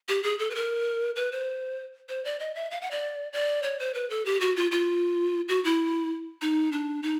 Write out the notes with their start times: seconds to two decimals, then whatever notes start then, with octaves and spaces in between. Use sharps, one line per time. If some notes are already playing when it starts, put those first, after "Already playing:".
0.09 G4
0.23 G#4
0.39 A4
0.50 B4
0.55 A#4
1.16 B4
1.32 C5
2.09 C5
2.25 D5
2.40 D#5
2.55 E5
2.71 F5
2.81 F#5
2.91 D5
3.33 D5
3.63 C#5
3.80 C5
3.94 B4
4.10 A4
4.25 G4
4.41 F#4
4.56 F4
4.72 F4
5.49 F#4
5.64 E4
6.42 D#4
6.72 D4
7.03 D#4